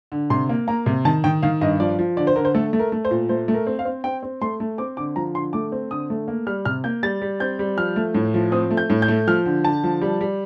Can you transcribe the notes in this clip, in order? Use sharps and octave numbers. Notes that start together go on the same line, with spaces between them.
D3
C3 C6
A#3
A#3 A#5
C3
D#3 A5
D#3 G5
D#3 F5
G2 D#5
F3 D5
F3
D3 D5
C5
D3 A#4
C5
A3 A4
A3
A#4
A3
C5
A#2
A3 C5
A3
A#4
C4
F5
C4
C4 G5
C4
A3 C6
A3
C4 D6
D3 D6
F3 A#5
D3 C6
A3 D6
C4
D3 D#6
A3
A#3
G3 F6
C3 F6
A#3 G6
G3 A6
G3
C4 G6
G3
F3 F6
A3
A2
F3
C4 D#6
A3
G6
A2
G6
A3
F3 F6
D3
D3 A5
F3
G3
G3